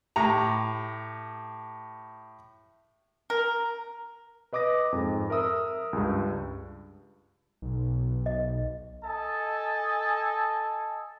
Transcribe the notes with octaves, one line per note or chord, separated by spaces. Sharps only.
A2 G4 A#5
A#4
B4 D#5 D6 D#6 A#6
F2 G#2
A#4 E5 D#6 E6
C#2 G2
B1
D#5
A4 D#5 G#5 A5